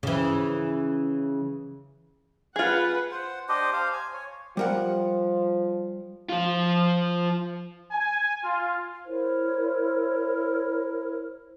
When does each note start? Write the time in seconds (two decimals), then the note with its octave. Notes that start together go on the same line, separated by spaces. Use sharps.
0.03 C#3 E3
2.56 F4 G#4 B4 F#5
3.11 C5 F#5
3.49 D4 G4 C5 D#5
3.73 C5 F5
3.93 G#5
4.14 C#5
4.57 F3 G3 A#4 F#5
6.29 F3 F4
7.91 G#5
8.43 F4
9.06 E4 A#4 C5 C#5